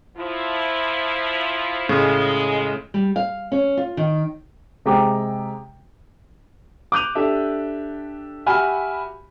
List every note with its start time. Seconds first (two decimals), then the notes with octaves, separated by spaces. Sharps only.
0.16 F3 E4
1.89 A2 C#3 G#3
2.94 G3
3.16 F5
3.52 C#4
3.77 F4
3.97 D#3
4.85 C3 G#3 G4 G5 A#5 D6
6.92 D6 F#6 G6 D#7 F7
7.15 D4 G4 A4 E5
8.46 F#4 G4 E5 G#5 B5 F6